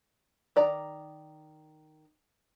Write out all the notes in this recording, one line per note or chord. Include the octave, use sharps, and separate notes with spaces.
D#3 D5 A#5